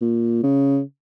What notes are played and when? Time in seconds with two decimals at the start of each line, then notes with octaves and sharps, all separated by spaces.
0.01 A#2
0.43 C#3